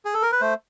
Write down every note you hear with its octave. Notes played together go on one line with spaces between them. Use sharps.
G#4
A4
A#4
B4
A3 C5